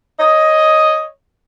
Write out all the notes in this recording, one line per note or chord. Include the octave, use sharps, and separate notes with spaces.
C#5 D#5